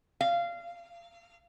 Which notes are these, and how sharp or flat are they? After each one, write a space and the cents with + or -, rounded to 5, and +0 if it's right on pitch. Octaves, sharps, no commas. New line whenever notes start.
F5 -20